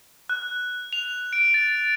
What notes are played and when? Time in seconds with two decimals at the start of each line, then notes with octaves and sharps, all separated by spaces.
0.30 F#6
0.93 F7
1.33 D7
1.54 A6